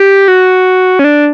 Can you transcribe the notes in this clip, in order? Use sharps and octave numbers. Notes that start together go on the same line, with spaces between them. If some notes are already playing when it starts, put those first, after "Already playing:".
Already playing: G4
F#4
C#4
D4